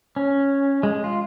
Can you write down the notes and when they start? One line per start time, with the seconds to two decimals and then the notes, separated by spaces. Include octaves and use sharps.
0.16 C#4
0.83 G#3
1.04 F4